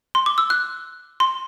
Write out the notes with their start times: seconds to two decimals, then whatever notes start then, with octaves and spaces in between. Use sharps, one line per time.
0.15 C6
0.26 D6
0.38 E6
0.50 F#6
1.20 C6